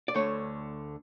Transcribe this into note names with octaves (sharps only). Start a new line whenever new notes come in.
D5
D2 D3 A3 C#5